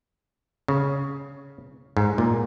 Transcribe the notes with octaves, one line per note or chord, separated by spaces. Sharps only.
C#3
G#2
A#2